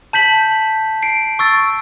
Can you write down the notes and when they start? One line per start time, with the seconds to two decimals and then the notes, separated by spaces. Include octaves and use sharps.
0.13 A5 G6 B6 F#7
1.03 C7 D7
1.39 C#6 E6 A6